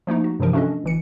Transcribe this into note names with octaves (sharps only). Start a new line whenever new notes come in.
F3 A3 A#3 D#4
F#4
G2 C3 E3 F3 A#4
A3 C#4 D4 F#4 A4 D#5
G1 E3 C#7